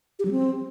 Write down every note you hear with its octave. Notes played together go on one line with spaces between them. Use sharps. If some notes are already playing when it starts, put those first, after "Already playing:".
G4
F#3
C4